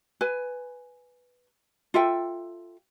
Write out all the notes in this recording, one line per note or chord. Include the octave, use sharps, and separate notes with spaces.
B4 G#5
F4 A4 E5 G5